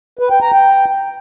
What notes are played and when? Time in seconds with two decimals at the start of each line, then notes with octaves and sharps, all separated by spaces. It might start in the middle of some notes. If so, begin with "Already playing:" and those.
0.19 B4
0.30 G5
0.42 A#5
0.53 G5